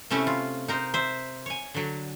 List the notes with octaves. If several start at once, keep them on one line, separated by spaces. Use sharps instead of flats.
C3 A3 C#4 E4
F4
D#4 A#4 C5
C5 E5
C#5 G#5
D3 F#3